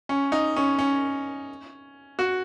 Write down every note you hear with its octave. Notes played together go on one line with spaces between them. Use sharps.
C#4
D#4
C#4
C#4
F#4